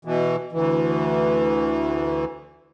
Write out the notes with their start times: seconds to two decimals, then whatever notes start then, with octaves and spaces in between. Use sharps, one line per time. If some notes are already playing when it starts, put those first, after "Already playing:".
0.05 B2 E3
0.53 D2 E3